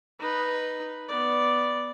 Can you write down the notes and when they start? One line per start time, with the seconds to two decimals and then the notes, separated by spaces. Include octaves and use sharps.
0.19 D#4 B4
1.09 B3 D5